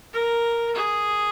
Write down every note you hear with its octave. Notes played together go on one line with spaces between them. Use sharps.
A#4
G#4